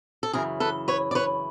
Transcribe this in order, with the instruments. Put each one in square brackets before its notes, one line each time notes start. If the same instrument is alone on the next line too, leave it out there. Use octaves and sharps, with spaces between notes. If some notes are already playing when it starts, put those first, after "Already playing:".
[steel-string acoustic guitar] A4
F#2 C#3 E3 G#4 A#4
A4 B4
B4 C#5
D5
B4 C#5